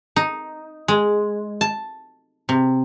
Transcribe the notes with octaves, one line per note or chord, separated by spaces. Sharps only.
D#4
G#3
A5
C3